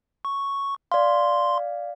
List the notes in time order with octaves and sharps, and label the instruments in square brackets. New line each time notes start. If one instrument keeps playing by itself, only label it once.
[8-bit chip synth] C#6
[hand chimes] D5 F5 [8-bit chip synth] C6